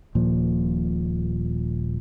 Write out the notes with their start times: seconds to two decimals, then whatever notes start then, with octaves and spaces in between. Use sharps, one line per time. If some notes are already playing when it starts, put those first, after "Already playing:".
0.15 D#1 A#2 F3